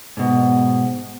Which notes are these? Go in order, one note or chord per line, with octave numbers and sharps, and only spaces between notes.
G#2 B2